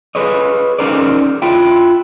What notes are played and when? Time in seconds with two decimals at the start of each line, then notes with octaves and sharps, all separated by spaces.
0.15 G#4 B4 C#5 D#5
0.79 C#4 D#4 G#4 A#4 C5 D5
1.42 E4 F4 E5 G5